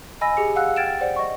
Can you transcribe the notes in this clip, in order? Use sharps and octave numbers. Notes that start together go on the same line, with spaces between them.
D#5 G#5 B5 E6 A#6
G4 G#4 C#7
F5 F#5 E6 F#6
G5 F6 G#6 A6 D7 E7
C5 D5 F#5
D#5 C#6